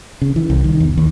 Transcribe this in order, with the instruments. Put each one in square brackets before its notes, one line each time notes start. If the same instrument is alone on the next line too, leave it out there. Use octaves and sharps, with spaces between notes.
[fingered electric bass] C#3
E3
C2
D#3
E2
D#2